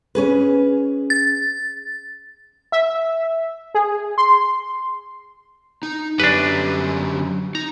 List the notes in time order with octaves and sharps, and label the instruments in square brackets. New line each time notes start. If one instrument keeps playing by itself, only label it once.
[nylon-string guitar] C#4 G#4 B4
[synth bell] A6
[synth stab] E5
G#4
C6
[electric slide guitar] D#4
[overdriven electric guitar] F#2 [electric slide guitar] D3 G4 [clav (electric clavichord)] D4 B4
[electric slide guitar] D#4 [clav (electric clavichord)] A#5